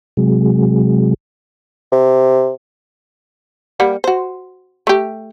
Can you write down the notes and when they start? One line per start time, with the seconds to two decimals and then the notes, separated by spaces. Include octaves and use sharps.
0.17 C3 F#3 G#3
1.92 C3
3.80 G3 A#3 F#5
4.04 F#4 C5
4.87 A3 G4